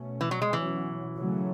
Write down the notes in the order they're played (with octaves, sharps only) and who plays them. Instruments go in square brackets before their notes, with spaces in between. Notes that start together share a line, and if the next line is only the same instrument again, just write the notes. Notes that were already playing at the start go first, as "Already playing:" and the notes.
Already playing: [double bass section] B2 A3 C#4
[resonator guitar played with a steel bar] E3
F#3
G#3
[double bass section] B2 F#3 C#4 [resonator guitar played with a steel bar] E3
[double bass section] C#3 F#3 A3 C#4